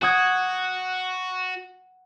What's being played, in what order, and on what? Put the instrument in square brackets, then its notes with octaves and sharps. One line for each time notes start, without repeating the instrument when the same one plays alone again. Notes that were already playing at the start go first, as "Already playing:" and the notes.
[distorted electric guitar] F#4 [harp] F#5 D#6 G#6